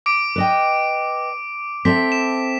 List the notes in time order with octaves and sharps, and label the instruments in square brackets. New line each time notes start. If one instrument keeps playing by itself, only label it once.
[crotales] D6 D7
[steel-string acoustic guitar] B4 D#5 G5
[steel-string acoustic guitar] C4 A4 E5 [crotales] B6
[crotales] E7